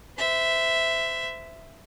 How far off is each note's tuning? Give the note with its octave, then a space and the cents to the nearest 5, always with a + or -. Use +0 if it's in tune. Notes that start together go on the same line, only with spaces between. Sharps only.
C5 -35 E5 +0